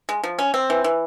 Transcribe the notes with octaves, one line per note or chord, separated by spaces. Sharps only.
G#3
F3
C#4
C4
E3
E3